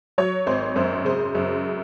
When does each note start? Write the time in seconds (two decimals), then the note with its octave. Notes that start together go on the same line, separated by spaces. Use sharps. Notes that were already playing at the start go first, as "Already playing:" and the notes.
0.18 F#3 C#5
0.47 G#1 C5
0.76 F#2 C5
1.05 C#3 C5
1.35 F#2